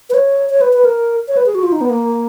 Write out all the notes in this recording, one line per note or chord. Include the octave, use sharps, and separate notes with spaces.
B4
C#5
C#5
B4
B4
A#4
C#5
B4
G#4
F#4
F4
D#4
B3
A#3